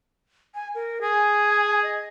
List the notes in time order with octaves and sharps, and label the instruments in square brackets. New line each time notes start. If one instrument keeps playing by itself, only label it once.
[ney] G#5
A#4
[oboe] G#4 [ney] G#5
[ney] D#5